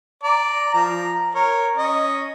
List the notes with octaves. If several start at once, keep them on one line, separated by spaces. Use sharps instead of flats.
D5 A#5
F3 A#5
A#4 C#5
C#4 D#5